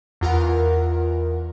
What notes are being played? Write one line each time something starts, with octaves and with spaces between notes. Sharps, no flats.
E2 F4 A#4 F#5